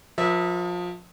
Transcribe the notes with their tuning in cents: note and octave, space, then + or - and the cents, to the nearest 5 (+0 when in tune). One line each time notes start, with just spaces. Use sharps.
F3 +25 A#4 +45 E5 -20